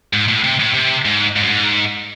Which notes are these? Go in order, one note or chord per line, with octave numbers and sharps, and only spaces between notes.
G#2
A2
C3
A2
C3
G#2
G#2
F#2
G#2